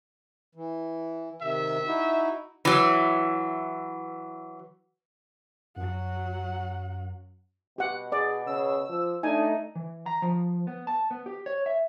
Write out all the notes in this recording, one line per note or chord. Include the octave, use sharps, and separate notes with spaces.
E3
C3 D#3 E5
D#4 E4 F#4
E3 F#3
F#2 F#3 F#5
B2 G4 F#5
G#4 D5
C#3 E6
F3
A3 D4 D#4 G#5
E3
A#5
F3
B3
A5
B3
G4
C#5
E5